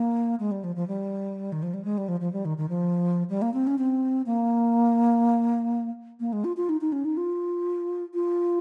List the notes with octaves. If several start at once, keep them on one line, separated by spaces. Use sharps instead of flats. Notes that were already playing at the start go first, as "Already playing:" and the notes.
Already playing: A#3
G#3
G3
F3
F3
G3
D#3
F3
G3
G#3
G3
F3
F3
G3
D#3
D#3
F3
G3
A#3
C4
C#4
C4
A#3
A#3
G#3
F4
F4
D#4
D#4
C#4
D#4
F4
F4